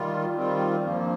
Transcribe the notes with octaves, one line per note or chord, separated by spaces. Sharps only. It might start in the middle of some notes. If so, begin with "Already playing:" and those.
Already playing: D#3 G3 F4
D#3 G3 C4 F4
G2 F3 A#3